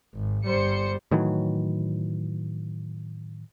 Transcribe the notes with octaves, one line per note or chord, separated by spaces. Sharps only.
G#1
G1 G3 C5 C#7
A2 D#3 E3 F#3